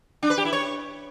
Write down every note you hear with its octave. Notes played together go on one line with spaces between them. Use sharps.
D4
B4
G4
E4
C#5